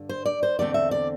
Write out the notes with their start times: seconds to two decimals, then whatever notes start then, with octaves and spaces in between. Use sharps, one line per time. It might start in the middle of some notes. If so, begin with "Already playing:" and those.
Already playing: G2 D3
0.09 C5
0.26 D5
0.43 C5
0.59 E2 D3 A3 C4 D5
0.74 E5
0.91 D5